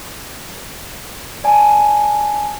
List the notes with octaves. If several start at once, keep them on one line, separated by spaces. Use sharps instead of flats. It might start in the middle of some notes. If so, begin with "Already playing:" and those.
D5 G#5 A5